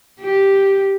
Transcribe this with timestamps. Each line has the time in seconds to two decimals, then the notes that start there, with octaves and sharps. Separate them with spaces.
0.20 G4